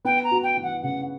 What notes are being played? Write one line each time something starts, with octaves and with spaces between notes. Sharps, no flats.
B3 G5
A#5
F#4
G5
E3
F#5
C#3 F#5